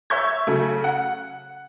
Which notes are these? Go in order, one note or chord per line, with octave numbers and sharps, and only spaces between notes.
C#5 E5 C#6 G6 G#6
C#3 F#3 A3
F#5